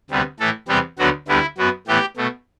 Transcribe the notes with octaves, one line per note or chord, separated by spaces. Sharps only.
D2 C3 G3 B3
A2 E3 A3 A4
E2 C3 G3 B3 G4
D2 D3 F#3 B3 F#4
D2 D3 G3 B3 E4
F#2 F#3 B3
A2 E3 B3 G4
B2 A3